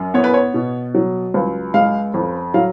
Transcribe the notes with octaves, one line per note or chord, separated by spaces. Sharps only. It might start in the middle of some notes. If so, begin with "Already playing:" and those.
Already playing: F#2
B3 C#5
B4
C#5
B2
F#3
C#2
G#3 F5
F2
F#3 F5